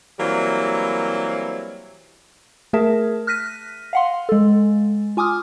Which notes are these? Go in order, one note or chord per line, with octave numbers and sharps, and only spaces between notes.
E3 F#3 G3 A#3 C4 E4
A3 G#4 A#4 E5 A5
F6 F#6 A#6 B6 D#7
F5 F#5 C6
G#3 A4
F4 G#5 D6 D#6 F6